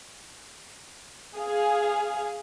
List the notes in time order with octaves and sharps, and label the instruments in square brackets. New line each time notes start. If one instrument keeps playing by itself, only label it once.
[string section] G#4 F5